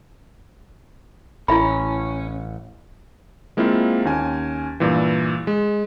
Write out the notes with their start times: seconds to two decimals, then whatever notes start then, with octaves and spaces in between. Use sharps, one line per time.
1.48 A1 C#4 E4 E5 B5
3.57 G#3 A#3 C4 E4 F4
4.05 D#2 C#4 G#5
4.80 G2 A#2 E3
5.47 G#3